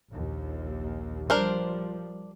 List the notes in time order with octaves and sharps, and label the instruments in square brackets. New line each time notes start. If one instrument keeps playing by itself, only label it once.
[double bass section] A#1 D#2
[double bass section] F3 G3 [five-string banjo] D4 A#4 C5